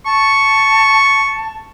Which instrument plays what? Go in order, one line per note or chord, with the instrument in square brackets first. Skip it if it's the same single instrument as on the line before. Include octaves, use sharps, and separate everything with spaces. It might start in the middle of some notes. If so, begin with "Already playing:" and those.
[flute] A5 [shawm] C#6